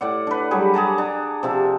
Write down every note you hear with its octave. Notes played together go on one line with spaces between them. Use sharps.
A2 D5 F#5
D4 B4
F#3 G3 G#4
G#4 F#5 A5 A#5
D4
C3 F3 E5